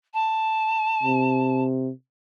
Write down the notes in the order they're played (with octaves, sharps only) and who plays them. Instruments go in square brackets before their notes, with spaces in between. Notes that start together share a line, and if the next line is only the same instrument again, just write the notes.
[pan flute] A5
[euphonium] C3